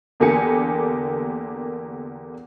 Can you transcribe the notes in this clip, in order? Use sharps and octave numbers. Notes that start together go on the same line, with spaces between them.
E2 D3 A#3 G4 G#5 C#7